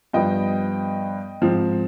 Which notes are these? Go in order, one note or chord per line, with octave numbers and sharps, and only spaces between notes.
G2 F3 B3 D#5 G5
G#2 F3 C4